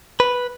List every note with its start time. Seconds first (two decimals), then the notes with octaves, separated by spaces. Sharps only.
0.20 B4